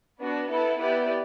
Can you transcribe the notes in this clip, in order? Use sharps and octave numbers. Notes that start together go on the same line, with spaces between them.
B3 D4 F#4
B3 E4 A4
B3 E4 G4 B4 D5